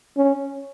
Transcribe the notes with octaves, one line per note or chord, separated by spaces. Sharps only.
C#4